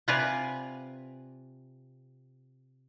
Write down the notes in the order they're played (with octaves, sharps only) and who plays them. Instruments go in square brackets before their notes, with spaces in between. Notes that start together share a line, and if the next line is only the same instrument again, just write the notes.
[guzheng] C3 F4 B4 D5 G#5 A#5